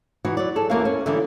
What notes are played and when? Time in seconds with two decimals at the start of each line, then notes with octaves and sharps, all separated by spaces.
0.25 E3 D#4 F#4
0.37 F#3 D5
0.56 G#4 A4
0.70 E2 A#3 C#4 F#4 E5 F5
0.85 C#4
1.06 D3 E3 G3 D#4 E4